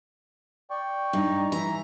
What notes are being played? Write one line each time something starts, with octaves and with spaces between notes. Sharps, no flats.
D5 G5 C#6
G2 D#4
E3 A#5